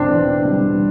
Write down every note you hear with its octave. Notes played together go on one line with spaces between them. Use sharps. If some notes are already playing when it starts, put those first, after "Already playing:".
Already playing: E1 C4 D4
E2
G3